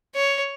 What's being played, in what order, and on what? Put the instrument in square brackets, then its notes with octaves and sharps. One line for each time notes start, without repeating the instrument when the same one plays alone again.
[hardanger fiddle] C#5